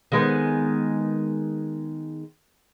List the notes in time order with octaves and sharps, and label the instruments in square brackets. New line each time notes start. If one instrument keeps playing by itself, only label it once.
[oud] D#3 G#3 B3